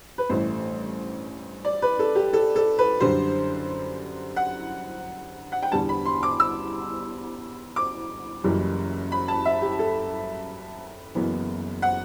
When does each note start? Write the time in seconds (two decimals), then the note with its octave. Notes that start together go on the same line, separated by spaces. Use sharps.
0.18 B4
0.30 A1 G2 E3 A3 C5
1.65 D5
1.82 B4
1.99 A4
2.15 G4
2.33 A4
2.56 A4
2.79 B4
3.00 F#2 D3 G3 C5
4.36 F#5
5.52 F#5
5.63 G5
5.72 E2 D3 G3 B3 A5
5.89 B5
6.06 C6
6.23 D6
6.40 E6
7.76 D6
8.44 F#1 F#2 E3 G3
9.12 B5
9.28 A5
9.45 E5
9.62 G4
9.79 A4
11.15 F#1 F#2 E3 B3
11.82 F#5